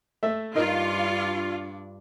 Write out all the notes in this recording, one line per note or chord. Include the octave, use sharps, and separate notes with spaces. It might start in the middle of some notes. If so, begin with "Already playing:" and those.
A3 E5
G2 D4 D#4 F4 A#4